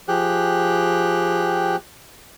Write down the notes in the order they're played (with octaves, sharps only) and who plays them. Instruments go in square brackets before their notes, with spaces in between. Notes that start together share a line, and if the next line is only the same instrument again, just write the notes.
[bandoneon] F3 G4 G#4 G5 F#6